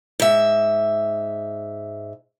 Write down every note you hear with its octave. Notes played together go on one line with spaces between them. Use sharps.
G#2 E5